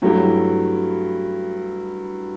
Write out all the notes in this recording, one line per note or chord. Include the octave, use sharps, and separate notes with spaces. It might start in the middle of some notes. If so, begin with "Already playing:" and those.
G2 F#3 A3 E4 G4